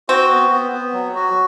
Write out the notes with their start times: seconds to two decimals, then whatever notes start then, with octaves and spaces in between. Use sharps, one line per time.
0.09 C4 F#4
0.30 B3
0.51 B3
0.72 B3
0.93 F#3
1.15 F#4